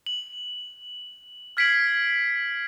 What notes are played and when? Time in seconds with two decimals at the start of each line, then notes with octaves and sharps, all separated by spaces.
0.06 F#7
1.57 F6 G#6 B6 C7 D7 F#7